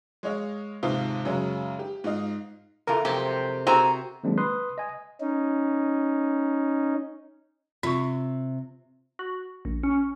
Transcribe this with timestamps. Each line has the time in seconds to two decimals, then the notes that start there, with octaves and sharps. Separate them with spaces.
0.23 G#3 C#5 D#5 F5
0.83 D#2 G#2 C3 F4 F5 D#6
1.25 F#2 C#3 F#3 G#3 C#4
1.79 G4
2.04 G#2 F4 D#5 F5
2.87 E2 E3 F4 A4 A#4
3.05 F2 C3 F#3 G#3 G4
3.67 C4 F#4 G#4 A#5
4.24 D#3 F#3 G#3 A#3 C4 D4
4.38 B4 B5 C6 D#6 F#6
4.78 D#5 G#5
5.21 C#4 D#4
7.83 C3 F4 C#6
9.19 F#4
9.65 A#1
9.83 C#4